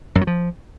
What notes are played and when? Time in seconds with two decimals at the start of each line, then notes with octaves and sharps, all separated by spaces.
0.15 F#2
0.21 F#3
0.27 F3